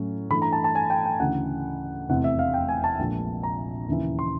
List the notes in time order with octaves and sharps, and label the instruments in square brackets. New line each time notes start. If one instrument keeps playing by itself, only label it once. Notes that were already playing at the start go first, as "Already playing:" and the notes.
Already playing: [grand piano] A2 F#3 A3 C#4
G2 E3 A3 B5
A#5
A5
A5
G#5
G5
G5
D2 C#3 E3 F#5
F1 E2 C3 E3 A3 F#5
E5
F5
G5
G#5
A5
A#1 A#2 F3 G#3
A#5
D#2 C#3 E3
C6